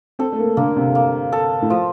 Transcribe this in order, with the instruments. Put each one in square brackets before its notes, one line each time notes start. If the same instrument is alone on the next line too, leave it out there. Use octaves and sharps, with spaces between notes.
[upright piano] C4 [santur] A4
[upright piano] A3
A#3
[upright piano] D3 [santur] A#3
[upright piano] C3
[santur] A#3
A4
[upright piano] A2
[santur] F3